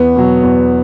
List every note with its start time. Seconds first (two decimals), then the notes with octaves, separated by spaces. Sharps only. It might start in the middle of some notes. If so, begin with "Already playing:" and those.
Already playing: E2 B3
0.16 B2 F#3
0.43 E2